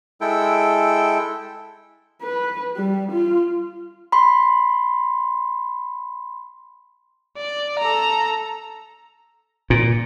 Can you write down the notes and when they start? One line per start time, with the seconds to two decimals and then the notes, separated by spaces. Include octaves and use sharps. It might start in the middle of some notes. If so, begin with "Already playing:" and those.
0.21 G#3 E4 A4 G5
2.22 B4
2.77 G3
3.12 F4
4.12 B5 C6
7.37 D5
7.79 A4 A#5
9.70 A#2